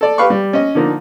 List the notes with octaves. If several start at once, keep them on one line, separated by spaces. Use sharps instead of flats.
A4 D5
G4 B4 F5 B5 C#6
G3
C#4 D#5
D3 F3 A#3 D#4